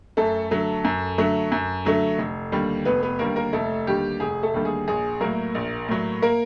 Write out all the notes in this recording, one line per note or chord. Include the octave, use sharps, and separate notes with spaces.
F#2 A3 A4
D3 F#3 A3
F#2
D3 F#3 A3
F#2
D3 F#3 A3
F1
D#2 D3 G3
F1 B3 B4
B3 B4
D#2 D3 G3 A#3 A#4
A#3 A#4
F1 A3 A4
D#2 D3 G3 G4
F1 G#4
A3 A4
D#2 D3 G3
G#4
A#1 G#4
A2 F#3 A#3 A#4
A#1
A2 F#3
A#3 A#4